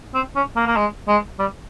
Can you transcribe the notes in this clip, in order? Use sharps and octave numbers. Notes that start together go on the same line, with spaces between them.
C4
C#4
A#3
A#3
G#3
G#3
G3